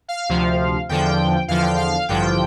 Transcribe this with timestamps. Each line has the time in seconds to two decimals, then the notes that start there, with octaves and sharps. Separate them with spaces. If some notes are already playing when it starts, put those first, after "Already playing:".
0.08 F5
0.29 D2 C3 F3
0.89 E2 D3 F3 G5
1.48 E2 D3 F3 F5
1.62 G5
1.76 F5
2.09 A1 G2 D3 F3 G5